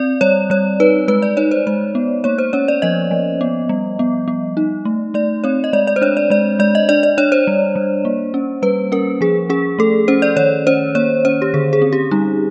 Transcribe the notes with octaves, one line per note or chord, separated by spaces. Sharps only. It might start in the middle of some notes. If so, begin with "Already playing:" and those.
Already playing: C4 D5
G3 C#5
G3 C#5
D#4 B4
G#3 B4
D5
D#4 C#5
C5
G#3 C5
B3
A#3 C#5
C5
C#4 C#5
D5
F3 D#5
F3
B3
G3
B3
B3
D#4
A3
A3 D5
C4 C#5
D#5
G#3 D5
D5
C5
D4 C#5
D5
G#3 D5
G#3 D5
D#5
D4 D5
D5
D4 C#5
C5
G3
G3
A#3
C#4
G3 B4
C#4 A#4
F3 G#4
C#4 G#4
A3 A4
C#4 C5
D5
D#3 C#5
C#4 C5
A#3 C#5
C#4 C5
G4
D3 G#4
G#4
C4
G4
G3 D#4